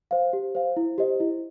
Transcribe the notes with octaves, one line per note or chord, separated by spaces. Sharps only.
C5 F5
G4
C5 F5
E4
G4 C5 D#5
E4